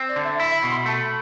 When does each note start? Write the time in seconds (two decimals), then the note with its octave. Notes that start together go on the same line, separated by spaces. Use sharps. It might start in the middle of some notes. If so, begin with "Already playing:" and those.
Already playing: C4
0.09 D5
0.16 D3
0.24 E5
0.40 E4 E5
0.55 B5
0.63 B2
0.70 C6
0.79 B5
0.86 A3 A5
0.93 B5